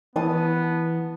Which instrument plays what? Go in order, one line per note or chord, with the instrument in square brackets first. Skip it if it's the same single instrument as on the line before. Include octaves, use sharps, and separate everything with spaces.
[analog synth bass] E3 [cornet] B3 [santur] A5 D#6